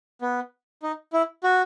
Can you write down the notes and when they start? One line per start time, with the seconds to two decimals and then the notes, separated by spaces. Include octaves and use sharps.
0.22 B3
0.83 D#4
1.13 E4
1.44 F#4